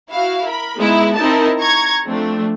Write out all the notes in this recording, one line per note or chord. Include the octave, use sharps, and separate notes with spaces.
E4 F#4 F5
A#4 B5
G#3 B3 D#4 E4
C4 D#4 E4 A#4 A5
A#5 C#6 G#6
F3 A3 C4 D4